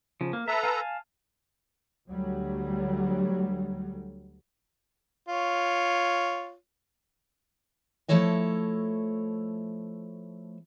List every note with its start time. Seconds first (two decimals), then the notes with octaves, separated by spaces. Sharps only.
0.21 C#3 F3
0.33 A#3
0.48 A4 B4 E5 A#5
0.63 F5 G#5 A5
2.07 D2 F#3 G3
5.28 F4 C#5
8.08 F3 A3 E4 A4 C#5 D#5